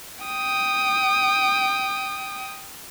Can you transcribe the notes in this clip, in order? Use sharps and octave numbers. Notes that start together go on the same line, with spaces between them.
G5 D#6